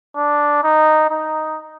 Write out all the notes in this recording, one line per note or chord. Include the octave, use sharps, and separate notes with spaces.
D4
D#4
D#4